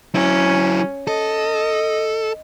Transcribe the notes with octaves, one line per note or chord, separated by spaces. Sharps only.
F#3 C#4 E4
A4 D#5